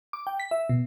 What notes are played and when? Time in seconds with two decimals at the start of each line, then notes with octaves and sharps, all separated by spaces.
0.13 D6
0.27 G5
0.40 B6
0.51 E5
0.69 B2